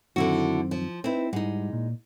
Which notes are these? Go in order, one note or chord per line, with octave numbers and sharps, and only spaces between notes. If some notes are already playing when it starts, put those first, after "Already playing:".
F#2 D3 D#3 C4 E4 F#4
F3
C4 D#4 E4 B4
G#2 G3 G#3 D#4 F#5
A#2